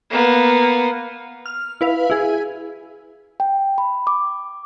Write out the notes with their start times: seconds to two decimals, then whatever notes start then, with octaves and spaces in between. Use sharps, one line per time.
0.10 A#3 B3
1.46 F6
1.81 E4 B4 F5
2.10 E4 G#4
3.40 G5
3.78 B5
4.07 D6